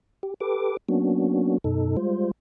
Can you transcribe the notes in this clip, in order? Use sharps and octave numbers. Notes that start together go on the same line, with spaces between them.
G4
G4 A4 B4 D6
F#3 A#3 B3 C#4 D4 F#4
F#2 B2 D#4 A4
G3 G#3 F4 C5